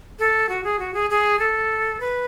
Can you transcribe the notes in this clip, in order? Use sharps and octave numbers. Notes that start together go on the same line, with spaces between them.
A4
F#4
G#4
F#4
G#4
G#4
A4
B4